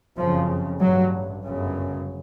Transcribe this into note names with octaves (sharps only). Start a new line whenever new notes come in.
F#1 F2 C#3 F3
A1 G2 F#3
G1 F#2 C#3